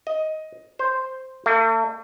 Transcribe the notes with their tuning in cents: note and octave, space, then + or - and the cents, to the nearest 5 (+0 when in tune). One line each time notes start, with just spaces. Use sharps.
D#5 +10
C5 +0
A3 +40